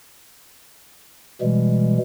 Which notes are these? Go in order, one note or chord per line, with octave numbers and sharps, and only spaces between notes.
B2 E3 G3 G#3